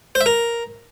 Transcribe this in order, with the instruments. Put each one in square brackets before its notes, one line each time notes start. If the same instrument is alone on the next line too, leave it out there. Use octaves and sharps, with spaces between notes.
[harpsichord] C5
E5
A#4